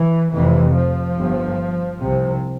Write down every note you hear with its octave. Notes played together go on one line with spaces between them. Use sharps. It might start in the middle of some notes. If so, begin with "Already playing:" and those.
Already playing: E3
F1 F2 C3 E3
F3
G1 G2
C2 C3